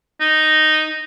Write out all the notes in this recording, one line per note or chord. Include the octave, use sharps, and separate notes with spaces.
D#4